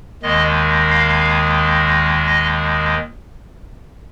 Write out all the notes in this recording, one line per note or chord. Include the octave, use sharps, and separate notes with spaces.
D#2 D#3 G#3 D#5
F5
D#5